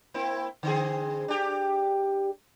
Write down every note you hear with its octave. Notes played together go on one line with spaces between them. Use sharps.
A#3 C4 E4
D3 C4 G#4
D4 G4